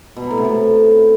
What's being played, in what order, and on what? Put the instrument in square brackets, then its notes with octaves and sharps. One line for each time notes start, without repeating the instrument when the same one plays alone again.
[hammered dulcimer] B2
F#3
A2
C3
A2